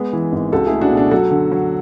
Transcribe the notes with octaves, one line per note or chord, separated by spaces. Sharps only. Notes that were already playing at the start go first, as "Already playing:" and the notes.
Already playing: G#3 B3
E3
G#1
C#2 F#4 A4
A3 E4 G#4
D4 F#4
B2
D4
F#3 F#4 A4
D3
F#3